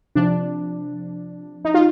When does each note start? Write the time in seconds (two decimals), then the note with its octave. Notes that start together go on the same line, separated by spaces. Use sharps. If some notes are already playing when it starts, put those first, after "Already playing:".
0.15 C3 F3 D4
1.65 D#4
1.74 F4